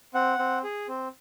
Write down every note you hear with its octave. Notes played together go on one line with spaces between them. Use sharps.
C4 F#5
C4
G#4
C4